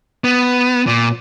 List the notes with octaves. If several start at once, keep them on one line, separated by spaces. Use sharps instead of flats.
B3
A#2